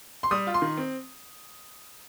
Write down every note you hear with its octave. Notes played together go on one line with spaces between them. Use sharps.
C6
G3 D#6
F4
C6
D#3
C4